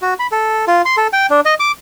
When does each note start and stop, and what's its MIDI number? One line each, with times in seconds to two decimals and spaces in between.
0.02 0.14 66
0.19 0.27 83
0.32 0.65 69
0.67 0.82 65
0.85 0.96 84
0.97 1.07 69
1.13 1.26 79
1.30 1.40 62
1.45 1.54 75
1.60 1.72 86